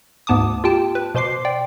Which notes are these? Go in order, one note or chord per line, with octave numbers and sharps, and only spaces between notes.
D2 G#2 B3 A5 D6 D#6
F4 G4 G5 A5
B4
B2 C5 C6 D6 C7
D5 G5